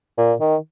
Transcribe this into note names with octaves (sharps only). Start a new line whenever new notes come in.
A#2
D#3